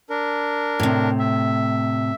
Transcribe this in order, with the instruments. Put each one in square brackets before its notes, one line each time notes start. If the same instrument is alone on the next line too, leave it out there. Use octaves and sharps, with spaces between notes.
[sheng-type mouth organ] D4 A#4
[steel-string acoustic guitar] A2 C3
[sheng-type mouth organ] E5